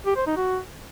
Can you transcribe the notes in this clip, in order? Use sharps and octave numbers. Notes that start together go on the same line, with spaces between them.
G4
C5
D#4
F#4